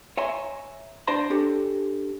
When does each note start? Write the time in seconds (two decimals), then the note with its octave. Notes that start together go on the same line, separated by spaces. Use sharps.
0.17 C#5 E5 G#5 A#5 C6
1.07 D4 C5 D5 A5 A#5 C6
1.30 C#4 D4 G4 A4